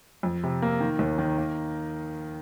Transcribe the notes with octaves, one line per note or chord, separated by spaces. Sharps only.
F2
C3
A#3
D#3
D#2
D#3
A#3